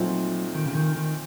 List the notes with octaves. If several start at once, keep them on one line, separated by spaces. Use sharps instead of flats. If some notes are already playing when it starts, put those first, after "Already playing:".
Already playing: A#2 F3 F#3 A3 C4 D#4
D#3
C#3
D#3
D#3